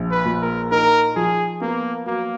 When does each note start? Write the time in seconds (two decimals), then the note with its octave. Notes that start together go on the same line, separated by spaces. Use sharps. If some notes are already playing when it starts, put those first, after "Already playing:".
Already playing: A#1
0.11 B4
0.25 A#2
0.41 A#4
0.71 D#4 A#4
1.16 F3 G#4
1.61 A#3 B3
2.06 F#3 A#3